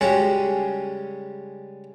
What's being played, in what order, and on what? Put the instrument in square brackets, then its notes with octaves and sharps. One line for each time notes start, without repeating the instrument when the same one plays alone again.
[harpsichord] C#3 G3 G#3 C#4 F#4 G#4